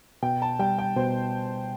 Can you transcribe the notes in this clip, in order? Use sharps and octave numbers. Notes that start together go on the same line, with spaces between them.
B2 G5
A5
G3 G5
G5
B2 C5